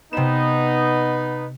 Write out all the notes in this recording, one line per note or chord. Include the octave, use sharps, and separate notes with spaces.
C3 B3 D#4 E7